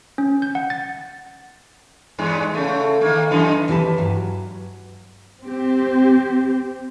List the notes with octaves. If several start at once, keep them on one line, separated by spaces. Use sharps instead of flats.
C#4
G6
F#5
A6
E2 G2 G#3
C#3 A3
D#3 A#3
F#2 E3 D#4
D#2 E3 G4 B4 G#5 A5
G2 F#3
C4 G4